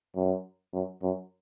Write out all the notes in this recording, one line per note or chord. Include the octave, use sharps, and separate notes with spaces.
F#2
F#2
F#2